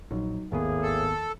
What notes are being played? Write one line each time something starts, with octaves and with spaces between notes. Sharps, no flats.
A#1 F#3 D#4
G#1 D#2 A2 D#3 A#3 B3 G#4
A4